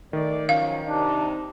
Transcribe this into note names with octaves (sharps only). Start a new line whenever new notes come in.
D#3 A3 D5
F3 F#3 C#4 F5
C3 D4 D#4